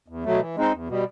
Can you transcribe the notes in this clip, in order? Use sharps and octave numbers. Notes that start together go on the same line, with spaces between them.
E2
B2 F#3 A3
E3
G#3 C4 D#4
E2
B2 G3